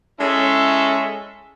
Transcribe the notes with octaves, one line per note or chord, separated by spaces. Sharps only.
G#3 C#4 E4 A4 E5